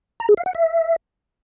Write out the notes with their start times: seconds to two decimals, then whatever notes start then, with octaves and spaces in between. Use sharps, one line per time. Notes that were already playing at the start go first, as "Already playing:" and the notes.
0.20 A#5
0.29 G#4
0.37 F5
0.46 F#5
0.55 E5